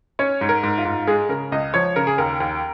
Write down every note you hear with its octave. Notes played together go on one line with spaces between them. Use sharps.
C#4 C#5
G#2
A#4
G#2
F4
G#2
G#3 G#4
C#3 A#4
C#2 D#5
F3 C#5
C#3 A#4
G#4
D#2 A#4
D#2